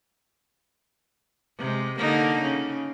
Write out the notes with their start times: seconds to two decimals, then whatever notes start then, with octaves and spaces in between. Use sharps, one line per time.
1.58 C3 G#3
1.98 D3 A#3 D#4
2.42 C#3